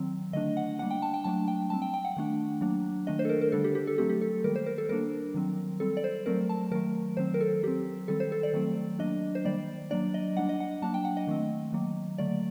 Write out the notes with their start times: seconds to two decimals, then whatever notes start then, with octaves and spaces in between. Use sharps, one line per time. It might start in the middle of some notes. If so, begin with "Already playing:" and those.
Already playing: D#3 F#3 C4
0.33 D3 A3 D4 D#5
0.57 F#5
0.79 G3 A#3 D4 F#5
0.91 G5
1.02 A5
1.14 G5
1.24 F#3 A3 D4 A5
1.48 G5
1.70 G3 C4 A5
1.82 G5
1.94 G5
2.05 F#5
2.17 D#3 A3 D4
2.61 F#3 A#3 D4
3.07 D#3 A3 D4 D#5
3.19 C5
3.25 A4
3.29 A#4
3.41 A#4
3.52 D3 G3 D4 A4
3.64 G4
3.75 G4
3.87 A4
3.98 F#3 A3 C4 G4
4.09 G4
4.21 A4
4.44 D#3 G3 A#3 A#4
4.56 C5
4.66 A#4
4.78 A4
4.89 G3 A#3 D4 A#4
5.34 D#3 F#3 C4
5.80 G3 C4 A4
5.97 D5
6.04 C5
6.26 F#3 A3 C4 A#4
6.49 A5
6.71 D#3 F#3 A3 A#4
7.17 D#3 F#3 C4 C5
7.34 A#4
7.41 A4
7.63 F#3 C4 G4
8.08 D#3 G3 C4 A4
8.20 C5
8.32 A4
8.43 D5
8.54 D#3 F#3 A3 C4
8.99 F#3 A#3 D4 D#5
9.35 C5
9.45 D#3 G3 A#3 D5
9.91 F#3 A#3 D4 D5
10.14 D#5
10.36 G3 A#3 D4 F#5
10.49 D#5
10.60 F#5
10.82 F#3 A#3 D4 A5
10.94 G5
11.05 F#5
11.17 D#5
11.27 D#3 A3 C4
11.73 D#3 F#3 A#3
12.18 D3 F#3 A3 D5